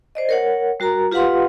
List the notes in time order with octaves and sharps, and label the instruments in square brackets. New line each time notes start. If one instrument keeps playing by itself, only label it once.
[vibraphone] C5 D5 D#5
A#4 C#5 F#5
G3 F#4 A#4 A#5
F4 G4 B4 F5 F#5 C6